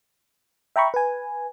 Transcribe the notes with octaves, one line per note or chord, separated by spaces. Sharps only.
E5 G5 A#5 B5 C#6
B4 G#5